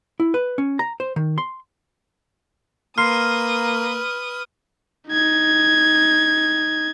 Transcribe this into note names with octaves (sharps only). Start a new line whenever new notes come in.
E4
B4
C#4
A#5
C5
D#3
C6
A#3 B4 C6 D#6 F6 C7
D#4 G#6